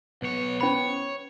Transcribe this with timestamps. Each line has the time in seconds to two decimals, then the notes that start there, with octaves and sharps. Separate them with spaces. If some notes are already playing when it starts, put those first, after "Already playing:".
0.22 B1 B3 C#5
0.61 C#4 C5 C#5 B5